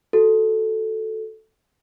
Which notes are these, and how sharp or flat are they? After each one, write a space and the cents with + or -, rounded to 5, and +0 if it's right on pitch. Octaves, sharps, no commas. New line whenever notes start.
F#4 +0 A4 +0